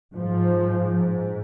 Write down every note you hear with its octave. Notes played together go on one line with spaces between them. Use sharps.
G#2 F3